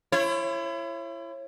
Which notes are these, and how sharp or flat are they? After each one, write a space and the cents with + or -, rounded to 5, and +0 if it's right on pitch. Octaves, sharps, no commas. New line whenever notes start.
E4 +35 C#5 -30